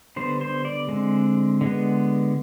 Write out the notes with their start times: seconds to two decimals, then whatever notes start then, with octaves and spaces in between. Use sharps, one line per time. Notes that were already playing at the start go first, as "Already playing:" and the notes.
0.16 D3 G3 B3 C5
0.41 C5
0.65 D5
0.89 D3 G#3 C4
1.61 D3 G#3 B3